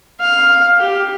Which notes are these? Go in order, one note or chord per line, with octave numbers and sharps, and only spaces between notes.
F5
G4